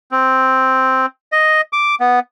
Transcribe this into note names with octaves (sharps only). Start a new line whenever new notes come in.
C4
D#5
D6
B3